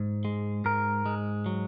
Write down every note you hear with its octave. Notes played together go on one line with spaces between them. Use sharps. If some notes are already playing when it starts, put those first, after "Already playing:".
Already playing: G#2
G#3
G#2 A#4
G#3
F#3